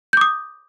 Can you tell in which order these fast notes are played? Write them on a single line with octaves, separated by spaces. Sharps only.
G6 D6 D#6